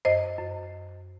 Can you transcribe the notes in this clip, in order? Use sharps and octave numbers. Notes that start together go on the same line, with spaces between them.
F#2 C5 D#5
F#2